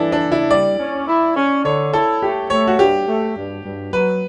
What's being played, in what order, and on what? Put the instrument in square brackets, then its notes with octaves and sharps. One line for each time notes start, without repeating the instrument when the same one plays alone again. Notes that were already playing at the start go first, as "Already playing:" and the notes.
Already playing: [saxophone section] E3 [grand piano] D4 E4 A4
[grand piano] D4
[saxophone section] C#3
[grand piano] E4
[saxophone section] G3 [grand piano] D5
[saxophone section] C#4
E4
C#4
[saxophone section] D3 [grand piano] C#5
[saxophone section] E4 [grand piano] A4
[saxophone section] A3 [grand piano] G4
[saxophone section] A3 [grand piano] C#5
[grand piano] F#4
[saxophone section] G2 [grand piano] G4
[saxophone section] A3
G2
G2
[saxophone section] F#3 [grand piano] B4